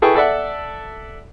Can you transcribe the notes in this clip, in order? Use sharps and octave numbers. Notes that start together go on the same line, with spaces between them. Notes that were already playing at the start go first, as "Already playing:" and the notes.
E4 G#4 A4 B4 G5 C#6
A4 D5 E5 F#5